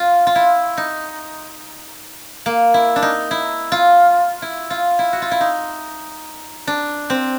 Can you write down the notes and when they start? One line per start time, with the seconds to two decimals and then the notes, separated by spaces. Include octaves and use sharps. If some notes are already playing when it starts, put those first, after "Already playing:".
Already playing: F4
0.27 F4
0.35 E4
0.77 D#4
2.46 A#3
2.74 E4
2.96 D4
3.02 D#4
3.31 E4
3.72 F4
4.42 E4
4.70 F4
4.99 E4
5.13 F#4
5.22 F4
5.31 E4
5.41 D#4
6.67 D4
7.10 C4